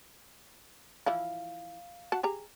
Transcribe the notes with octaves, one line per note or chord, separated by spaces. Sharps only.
E3 F3 E4 F5
F#4 F#5 A5
G4 G#4 A#5